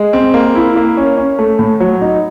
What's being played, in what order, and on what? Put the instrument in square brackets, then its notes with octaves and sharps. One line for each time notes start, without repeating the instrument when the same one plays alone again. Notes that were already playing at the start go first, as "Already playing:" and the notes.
Already playing: [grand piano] G#3
C4
A#3
E4
A#3
C#4
C#4
A3
A2
F#3
D#4